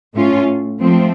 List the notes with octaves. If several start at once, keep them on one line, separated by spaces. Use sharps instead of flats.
A2 A3 C#4 F4
F3 A3 C4